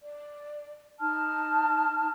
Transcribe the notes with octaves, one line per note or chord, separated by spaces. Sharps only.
D5
D#4 A5 F6